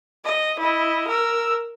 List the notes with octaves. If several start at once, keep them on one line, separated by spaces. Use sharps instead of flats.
D#5
E4 D#5
A#4 E6